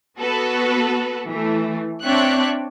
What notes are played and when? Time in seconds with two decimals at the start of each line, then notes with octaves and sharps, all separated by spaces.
0.20 B3 F#4 A4 B4
1.28 E3 A3
2.04 C4 D4 C#5 E5 G5 F#6